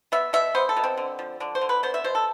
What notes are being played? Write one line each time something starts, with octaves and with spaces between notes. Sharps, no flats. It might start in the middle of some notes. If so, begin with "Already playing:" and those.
B3 E5
B2 E5
B3 C5
A4
B2
C4
D3
F3
D3 D4
C5
D3
B4
B3 C5
E5
B2 C5
A4